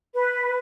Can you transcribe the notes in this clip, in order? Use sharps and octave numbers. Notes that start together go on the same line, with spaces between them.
B4